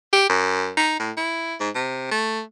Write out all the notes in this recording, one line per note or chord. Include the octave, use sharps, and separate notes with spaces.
G4
F#2
D#4
A2
E4
G#2
C3
A3